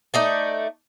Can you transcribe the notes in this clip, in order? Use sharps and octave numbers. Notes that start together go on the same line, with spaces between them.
A3 D#4 D5